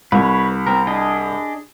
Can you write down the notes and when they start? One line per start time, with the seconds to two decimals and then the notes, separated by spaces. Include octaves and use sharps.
0.12 C2 B4 C#5
0.67 C4 A#4
0.87 D4 G#4 D#5